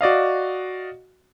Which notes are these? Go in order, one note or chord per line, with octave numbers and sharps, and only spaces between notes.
F#4 D5 D#5 F5